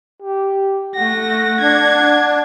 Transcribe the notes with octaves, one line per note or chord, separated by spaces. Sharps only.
G4
A3 F#5 A#6
D4 G#6